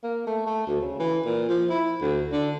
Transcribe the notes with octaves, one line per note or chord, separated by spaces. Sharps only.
A#3
A3
A3
D2
C#3
E3
A#2
F3
E4
D2
D3